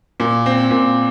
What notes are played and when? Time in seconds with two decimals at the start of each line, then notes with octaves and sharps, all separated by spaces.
0.20 A#2
0.46 C4
0.71 A#2